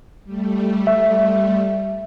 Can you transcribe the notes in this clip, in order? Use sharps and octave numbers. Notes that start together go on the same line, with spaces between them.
G3 A3
E5